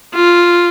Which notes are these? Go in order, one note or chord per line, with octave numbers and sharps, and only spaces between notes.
F4